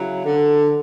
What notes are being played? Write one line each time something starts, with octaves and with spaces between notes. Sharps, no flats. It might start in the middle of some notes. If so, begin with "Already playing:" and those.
Already playing: C#3 F#3 E4
D3